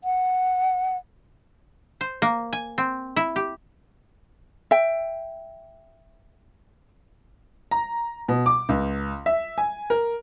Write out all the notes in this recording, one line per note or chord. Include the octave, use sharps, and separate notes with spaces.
F#5
C5
A#3
G#5
C4
E4
G4
E5 G5
A#5
B2
D6
C#2
E5
G#5
A#4